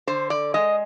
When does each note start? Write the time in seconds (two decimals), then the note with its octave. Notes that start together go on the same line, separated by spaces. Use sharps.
0.07 D3 C5
0.30 D5
0.54 G#3 D#5